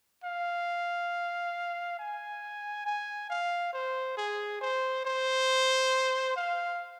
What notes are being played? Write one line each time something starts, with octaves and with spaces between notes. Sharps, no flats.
F5
G#5
G#5
F5
C5
G#4
C5
C5
F5